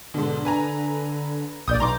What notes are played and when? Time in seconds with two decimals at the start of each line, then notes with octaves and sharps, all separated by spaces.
0.14 G#2 B2 D3
0.45 B4 G#5 A#5
1.68 A#1 D5 D#6 G6
1.80 B1 A#5 C6 D6